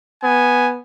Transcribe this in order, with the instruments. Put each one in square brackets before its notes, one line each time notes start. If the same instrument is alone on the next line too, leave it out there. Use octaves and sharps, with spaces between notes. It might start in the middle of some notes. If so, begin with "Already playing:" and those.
[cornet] B3 [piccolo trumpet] G#5